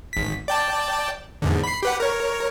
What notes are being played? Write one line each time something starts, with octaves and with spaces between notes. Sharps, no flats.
G#1 B6
D5 G5 A5
E2 G#2 D3
B5 C7
G4 B4 F#5
A#4 C#5